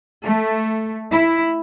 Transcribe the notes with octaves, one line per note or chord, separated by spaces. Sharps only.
A3
E4